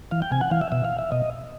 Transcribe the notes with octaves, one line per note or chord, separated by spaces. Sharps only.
E3 F5
G5
C3 G#5
F#5
E3 F5
E5
B2 E5
F5
E5
B2 D#5